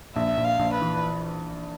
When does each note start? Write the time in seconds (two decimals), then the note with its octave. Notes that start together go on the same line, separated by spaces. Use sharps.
0.15 A#1 E5
0.37 A#1
0.44 F5
0.59 A#1
0.74 B4
0.81 E3